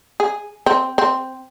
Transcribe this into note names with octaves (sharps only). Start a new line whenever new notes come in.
G#4
C4
C4